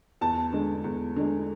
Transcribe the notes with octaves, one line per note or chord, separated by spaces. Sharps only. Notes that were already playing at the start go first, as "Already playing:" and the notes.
E2 A5
D3 G#3
E2
D3 G#3